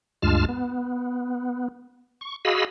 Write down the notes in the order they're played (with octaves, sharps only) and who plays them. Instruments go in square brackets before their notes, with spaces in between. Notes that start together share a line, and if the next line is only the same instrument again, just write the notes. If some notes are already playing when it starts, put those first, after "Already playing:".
[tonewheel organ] D2 G2 G#3 F4 A5 F6
B3
C#6
F#4 G#4 D#5 F5 B5 E6